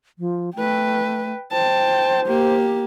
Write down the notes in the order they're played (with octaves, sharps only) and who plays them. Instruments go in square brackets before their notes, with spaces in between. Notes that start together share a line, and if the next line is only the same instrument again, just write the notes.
[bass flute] F3
[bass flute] A3 [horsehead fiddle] B4 G5
[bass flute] C5 [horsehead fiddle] G5 A5
[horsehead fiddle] A#3 G4